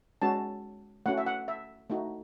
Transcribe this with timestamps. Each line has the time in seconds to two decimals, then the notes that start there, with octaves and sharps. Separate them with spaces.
0.22 G#3 C#4 F#4 A5
1.06 A3 C#4 F#4 F#5
1.18 E5
1.26 F#5
1.48 E5
1.90 A3 D#4 F#4